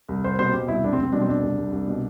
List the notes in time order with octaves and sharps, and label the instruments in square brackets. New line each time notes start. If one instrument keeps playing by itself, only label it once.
[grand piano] C2
C2 C5
B2 C5
B2 G4
C2 E4
C2 D4
C4
C2
C4
B2 D4
C4
C2 D4
C2
C2
C2
B2